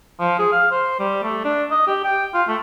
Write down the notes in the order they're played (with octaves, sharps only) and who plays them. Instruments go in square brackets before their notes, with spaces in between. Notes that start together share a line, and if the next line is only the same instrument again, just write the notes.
[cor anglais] F3
G#4
F5
C5
G3
A3
D4
D#5
G4
G5
F4
A3